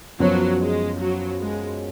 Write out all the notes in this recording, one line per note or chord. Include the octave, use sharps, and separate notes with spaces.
F#2 F3 F#3 B3 F#4 C#5
G#3
F#3
G#3